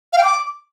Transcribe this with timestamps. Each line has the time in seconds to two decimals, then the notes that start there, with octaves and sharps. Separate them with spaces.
0.13 F5
0.18 G5
0.23 D6